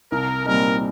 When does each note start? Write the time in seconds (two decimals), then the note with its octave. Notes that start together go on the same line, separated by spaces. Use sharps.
0.11 C2 A#4
0.45 A#2 G3 C4 D#4 A#4